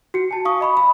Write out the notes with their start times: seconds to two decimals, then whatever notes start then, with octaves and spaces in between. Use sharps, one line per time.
0.14 F#4 C#7
0.31 G#5 A5
0.45 F5 C#6 D#6
0.61 D#5 B5 C#6
0.77 B5